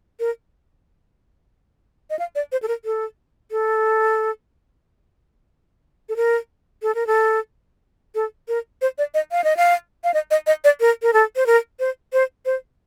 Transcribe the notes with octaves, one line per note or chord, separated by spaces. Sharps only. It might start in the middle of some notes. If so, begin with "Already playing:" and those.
A#4
D#5
F5
D5
C5
A4
A#4
A4
A4
A4
A#4
A4
A#4
A4
A4
A#4
C5
D5
D#5
F5
D#5
F5
F5
D#5
D#5
D#5
D5
A#4
A#4
A4
C5
A#4
C5
C5
C5